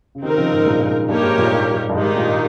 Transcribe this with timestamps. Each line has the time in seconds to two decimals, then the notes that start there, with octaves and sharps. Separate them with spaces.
0.15 C#3
0.23 C3 D#3 C4 D#4 A#4
0.37 C#3 F3
0.51 G#2 C3
0.66 G2 A#2
0.80 A#2
0.87 G#2
1.09 G2 A#3 D#4 G4 A#4 C#5
1.23 G#2
1.38 G2 A#2
1.51 G2
1.73 G2
1.89 G2
1.94 G#2 D#3 G#3 D#4 G4
2.16 G2 A#2